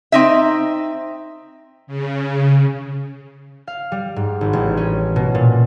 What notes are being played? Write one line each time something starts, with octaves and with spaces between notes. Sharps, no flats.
C4 D#4 E5
C#3
F5
G3
G#2
G#1
A1
C#4
B2
A#2